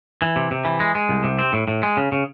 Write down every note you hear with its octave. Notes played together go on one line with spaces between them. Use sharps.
E3
C3
C3
E3
G#3
G#3
C2
C3
C4
A2
A2
G#3
C#3
C#3